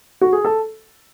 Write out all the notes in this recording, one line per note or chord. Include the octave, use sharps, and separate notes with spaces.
F#4
G#4
A4